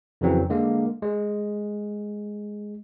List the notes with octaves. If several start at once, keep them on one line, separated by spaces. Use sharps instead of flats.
F2 C#3 E3 F#3 C4
D3 G#3 A#3
G#3